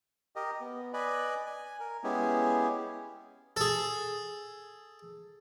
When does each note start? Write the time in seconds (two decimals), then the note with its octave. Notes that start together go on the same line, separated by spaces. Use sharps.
0.36 G4 A#4 D#5
0.61 B3
0.93 B4 D5 D#5 G#5 B5
1.46 G#5
1.80 A#4
2.04 G#3 B3 C#4 E4 G4 G#4
3.57 G#4 A4